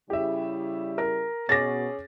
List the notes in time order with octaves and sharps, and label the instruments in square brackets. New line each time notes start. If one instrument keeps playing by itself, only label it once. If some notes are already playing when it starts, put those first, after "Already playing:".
[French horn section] C#3 G3 E4 [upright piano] G4 E5
[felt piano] A#4
[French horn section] B2 [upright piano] C#4 G#4 D6 [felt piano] A6 A#6